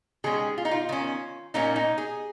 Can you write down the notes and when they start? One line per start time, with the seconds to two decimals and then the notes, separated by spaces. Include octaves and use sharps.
0.24 D#3 G#3 C#4 G#4
0.58 F4
0.65 D#4
0.71 F4
0.89 D#3 C#4
1.54 A#2 A#3 C#4 D#4
1.76 D#4
1.98 G#4